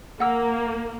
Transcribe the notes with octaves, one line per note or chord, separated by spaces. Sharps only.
A#3 F#5 E6